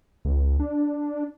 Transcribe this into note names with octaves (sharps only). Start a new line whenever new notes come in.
C#2
D4